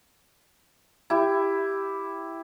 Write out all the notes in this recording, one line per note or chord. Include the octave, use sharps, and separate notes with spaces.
E4 G4